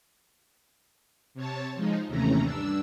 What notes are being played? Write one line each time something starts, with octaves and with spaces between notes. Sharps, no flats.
C3 C#5 A5
F3 G#3 D#4
D#2 C3 E3 A3 C#4 A#5
G2 D4 E6